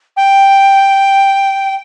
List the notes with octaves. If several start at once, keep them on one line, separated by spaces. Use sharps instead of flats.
G5